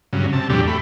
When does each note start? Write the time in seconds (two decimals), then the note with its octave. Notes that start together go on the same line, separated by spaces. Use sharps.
0.13 G2 C#3 F#3
0.33 C3 A5
0.50 E2 A2 F#3 G3 D4 G4
0.67 A3 B5